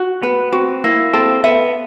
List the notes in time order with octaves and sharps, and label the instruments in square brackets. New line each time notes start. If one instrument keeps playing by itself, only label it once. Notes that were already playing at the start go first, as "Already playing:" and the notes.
Already playing: [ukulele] F#4
[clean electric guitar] B3 [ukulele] B4
[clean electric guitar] C4 [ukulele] F#4
[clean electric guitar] A#3 [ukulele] E4
[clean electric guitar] C4 [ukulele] A4
[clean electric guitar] B3 [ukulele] E5